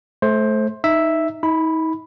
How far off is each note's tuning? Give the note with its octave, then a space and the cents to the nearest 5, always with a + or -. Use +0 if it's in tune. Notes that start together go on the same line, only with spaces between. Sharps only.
A3 -20 C5 +15
D#4 +0 E5 +0
D#4 +40 B5 +0